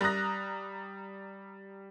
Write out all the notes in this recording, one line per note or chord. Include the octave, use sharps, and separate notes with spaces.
G3 A#5 D#6 F#6 A#6